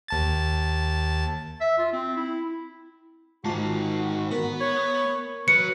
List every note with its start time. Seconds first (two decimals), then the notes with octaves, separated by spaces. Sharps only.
0.08 D#2 A5 A6
1.61 E5
1.78 F4
1.93 C4
2.17 E4
3.44 G#2 D#3 F4 F#4 A5 C7
4.31 B3 A#4
4.60 C#5
5.48 F#3 B4 C#7